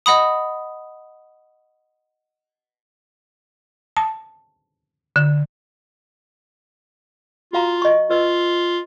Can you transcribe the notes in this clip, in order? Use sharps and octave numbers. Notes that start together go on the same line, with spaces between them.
D#5 F#5 B5 D#6
A5
D3
F4 F#4 F5 A#5
D#5 C#6
F4 B4 D#5 E6